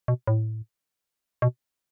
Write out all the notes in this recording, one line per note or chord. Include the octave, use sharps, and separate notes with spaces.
B2
A2
B2